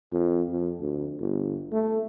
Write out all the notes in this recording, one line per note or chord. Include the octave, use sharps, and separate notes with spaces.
F2
F2
D2
G1
A3